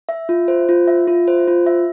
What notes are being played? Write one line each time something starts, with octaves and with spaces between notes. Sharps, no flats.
E5
F4
C5
F4
E5
F4
C5
F4
E5